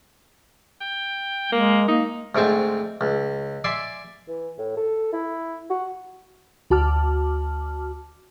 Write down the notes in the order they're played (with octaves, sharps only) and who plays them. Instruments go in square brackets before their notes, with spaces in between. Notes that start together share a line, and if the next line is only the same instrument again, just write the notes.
[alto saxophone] G5
[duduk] G#3 [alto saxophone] A#3
[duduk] A#3 [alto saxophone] D#4
[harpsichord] D2 G#2 C4 G#5 A5
C#2
D5 E5 G#5 C6
[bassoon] E3
A2
A4
E4
F#4
[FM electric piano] D2 F#4 A5 D6 F6